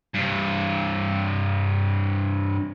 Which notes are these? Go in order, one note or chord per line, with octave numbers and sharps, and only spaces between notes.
G2 C3